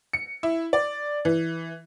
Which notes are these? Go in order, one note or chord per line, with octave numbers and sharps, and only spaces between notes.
C#7
E4
D5
E3